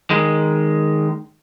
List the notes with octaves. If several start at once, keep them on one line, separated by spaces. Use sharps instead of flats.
D#3 G#3